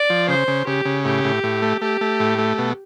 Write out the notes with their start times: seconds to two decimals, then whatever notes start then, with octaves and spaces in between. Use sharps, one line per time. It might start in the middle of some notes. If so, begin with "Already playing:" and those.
Already playing: D5
0.10 F3
0.28 C#3 C5
0.48 C#3
0.66 C#3 G4
0.85 C#3
1.05 A2 G4
1.24 A2
1.44 A2
1.62 A3
1.81 A3 G4
2.01 A3
2.20 A2
2.38 A3
2.58 B2